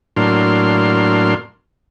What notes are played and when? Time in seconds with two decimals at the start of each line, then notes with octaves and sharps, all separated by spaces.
0.17 A2 F#3 A#3 D4 C6 F6